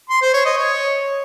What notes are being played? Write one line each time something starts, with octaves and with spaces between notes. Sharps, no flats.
C6
C5
C#5
D#5
C#5